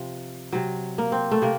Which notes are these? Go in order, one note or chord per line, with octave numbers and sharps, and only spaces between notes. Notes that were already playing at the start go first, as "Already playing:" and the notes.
Already playing: C3 F3
C3 F#3
A#3
C4
A3
C3 A#3